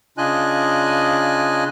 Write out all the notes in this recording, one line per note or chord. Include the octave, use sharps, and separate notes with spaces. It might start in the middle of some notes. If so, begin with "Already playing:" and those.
C#3 D4 F4 D#5 G#5 F#6